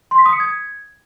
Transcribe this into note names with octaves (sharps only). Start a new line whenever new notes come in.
C6
B6
D#6
C#7
G#6